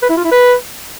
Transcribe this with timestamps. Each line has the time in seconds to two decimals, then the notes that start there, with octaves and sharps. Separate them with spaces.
0.02 B4
0.10 E4
0.17 F4
0.24 E4
0.32 B4